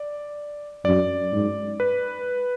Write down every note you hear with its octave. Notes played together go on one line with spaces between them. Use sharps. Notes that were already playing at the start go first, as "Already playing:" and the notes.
Already playing: D5
F#2 D5
G#2
B4